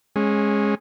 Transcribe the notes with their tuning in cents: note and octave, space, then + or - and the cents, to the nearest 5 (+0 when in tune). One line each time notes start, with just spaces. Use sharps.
G#3 +0 C#4 -20